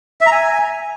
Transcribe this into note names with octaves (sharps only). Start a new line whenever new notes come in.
E5
A#5
G#5